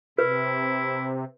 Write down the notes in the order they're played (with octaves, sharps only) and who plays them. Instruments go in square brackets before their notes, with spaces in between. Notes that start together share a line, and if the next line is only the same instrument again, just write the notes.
[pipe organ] C3 [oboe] E4 [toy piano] B4